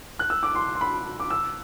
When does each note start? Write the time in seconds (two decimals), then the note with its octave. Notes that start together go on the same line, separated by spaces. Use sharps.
0.19 F#6
0.30 E6
0.43 D6
0.55 C6
0.75 C6
0.81 B5
1.20 D6
1.30 E6